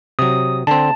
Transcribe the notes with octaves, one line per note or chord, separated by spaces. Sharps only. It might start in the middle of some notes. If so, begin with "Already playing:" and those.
C3 F#3 D#6
D3 C4 A5